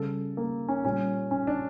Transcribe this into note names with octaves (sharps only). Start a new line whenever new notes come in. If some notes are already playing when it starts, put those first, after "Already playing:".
Already playing: C#3 G3 A4
A#3
C#4
A#2 G3 C#4
C#4
D4